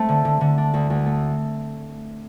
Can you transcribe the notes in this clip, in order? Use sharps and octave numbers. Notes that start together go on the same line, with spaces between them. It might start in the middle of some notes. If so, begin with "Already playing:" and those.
Already playing: A3 C4
D3
D3
D3
D4
D2
D2
A3